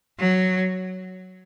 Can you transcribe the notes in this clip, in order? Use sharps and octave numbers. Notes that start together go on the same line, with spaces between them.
F#3